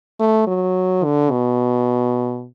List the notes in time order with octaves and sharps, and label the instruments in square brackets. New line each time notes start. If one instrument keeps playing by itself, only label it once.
[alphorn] A3
F#3
D3
B2